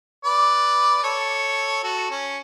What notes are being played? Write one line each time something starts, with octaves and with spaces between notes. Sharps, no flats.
B4 D5
A4 C#5
F#4 A4
C#4